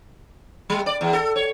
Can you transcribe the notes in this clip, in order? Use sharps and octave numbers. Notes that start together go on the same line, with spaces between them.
G3
D5
E2
A4
C#5